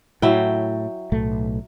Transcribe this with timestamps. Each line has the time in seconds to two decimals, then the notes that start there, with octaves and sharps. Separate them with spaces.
0.22 A2 F#3 E4 G5
1.12 B1 A2 A3